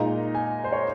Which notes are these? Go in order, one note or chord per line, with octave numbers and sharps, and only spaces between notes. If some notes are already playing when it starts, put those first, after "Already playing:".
Already playing: A#2 G#3 D#4 A#5
G#5
C5
C#5